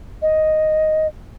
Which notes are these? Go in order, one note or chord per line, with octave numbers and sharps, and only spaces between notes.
D#5